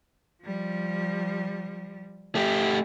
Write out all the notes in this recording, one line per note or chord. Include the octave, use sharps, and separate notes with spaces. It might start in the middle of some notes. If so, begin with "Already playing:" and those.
F3 G3
A3 G4 E5